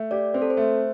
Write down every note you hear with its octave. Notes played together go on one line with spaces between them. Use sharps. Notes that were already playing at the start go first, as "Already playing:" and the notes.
Already playing: A3
G4 D5
C4 C5
A4
C5
A3